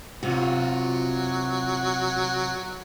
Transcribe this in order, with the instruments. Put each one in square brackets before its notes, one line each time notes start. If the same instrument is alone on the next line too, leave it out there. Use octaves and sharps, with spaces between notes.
[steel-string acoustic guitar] C3 [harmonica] F#3 [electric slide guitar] F4 F#4